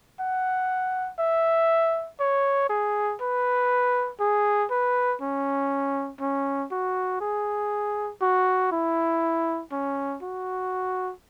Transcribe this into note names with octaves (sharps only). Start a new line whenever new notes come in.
F#5
E5
C#5
G#4
B4
G#4
B4
C#4
C#4
F#4
G#4
F#4
E4
C#4
F#4